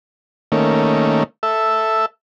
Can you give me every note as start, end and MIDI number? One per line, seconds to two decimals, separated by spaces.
0.52 1.24 51
0.52 1.24 57
0.52 1.24 58
0.52 1.24 61
1.43 2.06 69
1.43 2.06 76